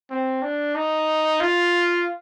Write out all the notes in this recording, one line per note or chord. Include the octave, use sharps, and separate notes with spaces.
C4
D4
D#4
F4